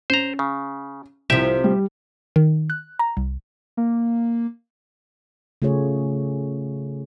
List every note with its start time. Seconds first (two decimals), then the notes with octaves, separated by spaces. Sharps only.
0.10 C#4 C5 A#5
0.39 C#3
1.30 C2 C3 F3 G4 E5
1.64 G3
2.36 D#3
2.70 F#6
2.99 A#5
3.17 C2
3.77 A#3
5.62 C#3 A3 F4 G#4 C#5